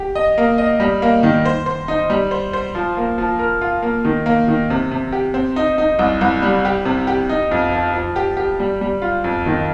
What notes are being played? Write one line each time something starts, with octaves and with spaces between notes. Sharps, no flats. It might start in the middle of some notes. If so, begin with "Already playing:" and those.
Already playing: G4
D#5
A#3
D#5
G3
A#3
D#3
C5
C5
D#4
G3
C5
C5
F3
A#3
F3
A#4
F4
A#3
D#3
A#3
D#3
C3
C3
G4
C4
D#4
D#4
C2
C2
G3
G4
C3
G4
D#4
F2
F3
F3
G4
G4
G3
G3
F4
F2
D#3